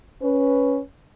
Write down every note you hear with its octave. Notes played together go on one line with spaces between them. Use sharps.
C#4 B4